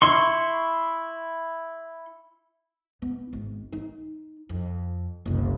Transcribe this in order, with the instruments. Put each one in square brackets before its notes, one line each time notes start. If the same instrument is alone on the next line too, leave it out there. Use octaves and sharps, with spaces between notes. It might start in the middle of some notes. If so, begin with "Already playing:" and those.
[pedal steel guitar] E4 C6 C#6
[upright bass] B3
G#1
D#4
F2
F#1 C2